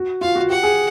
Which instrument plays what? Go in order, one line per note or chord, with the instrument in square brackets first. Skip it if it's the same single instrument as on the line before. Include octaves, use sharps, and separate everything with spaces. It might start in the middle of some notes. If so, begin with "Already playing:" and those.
Already playing: [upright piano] F#4
[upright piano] F4 [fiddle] F5
[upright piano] F#4
[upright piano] G4 [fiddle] F#5
[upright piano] G#4